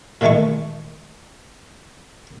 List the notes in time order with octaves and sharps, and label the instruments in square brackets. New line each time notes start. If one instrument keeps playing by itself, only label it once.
[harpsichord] A#2 D#3 E3 G#3 A3 C#6